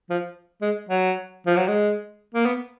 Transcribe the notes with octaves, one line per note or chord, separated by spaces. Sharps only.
F3
G#3
F#3
F3
F#3
G#3
A#3
B3